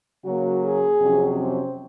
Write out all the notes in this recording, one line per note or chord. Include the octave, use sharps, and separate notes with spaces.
C#3 F#3 A#3 F#4
G#4
F2 C3 F#3 C#4
C5